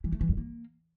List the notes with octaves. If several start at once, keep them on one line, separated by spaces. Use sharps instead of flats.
E3
A3
E3
G2
A#3